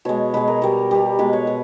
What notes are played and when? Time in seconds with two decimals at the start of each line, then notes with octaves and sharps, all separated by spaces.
0.05 B2 G#3 C#5
0.34 B2 G#3 B4
0.48 A#4
0.62 B2 G3 A#4
0.91 B2 G3
1.19 B2 G#3 B4
1.33 C#5
1.47 B2